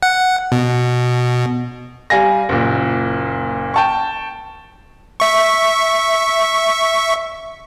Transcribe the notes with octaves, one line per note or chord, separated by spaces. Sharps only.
F#5
B2
G3 F5 G#5 A#6
F#1 A#2
G5 A5 C#6
E5 C#6